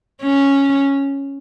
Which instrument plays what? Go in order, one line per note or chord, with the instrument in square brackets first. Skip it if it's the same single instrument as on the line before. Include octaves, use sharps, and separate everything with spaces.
[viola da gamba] C#4